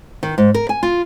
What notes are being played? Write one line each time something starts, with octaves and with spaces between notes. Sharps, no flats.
D#3
G#2
A#4
G#5
F4